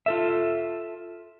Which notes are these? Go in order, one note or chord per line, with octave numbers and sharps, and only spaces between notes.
F4 A4 E5